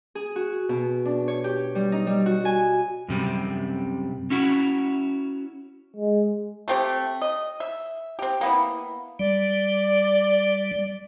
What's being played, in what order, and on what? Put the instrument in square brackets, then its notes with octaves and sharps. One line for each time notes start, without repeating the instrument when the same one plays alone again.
[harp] G#4
F#4
B2
D4
C#5
G4
G3
D#4
G3
F#4
G#5
[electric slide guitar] F#2 C3 G3
C#4 E4 F#4
[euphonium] G#3
[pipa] A3 C4 G4
D#5
E5
C4 G4
A#3 B3 E4
[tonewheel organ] G3 [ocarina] D5